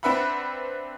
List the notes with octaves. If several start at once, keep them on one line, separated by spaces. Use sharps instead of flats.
C4 D4 B4 E5 F#5 B5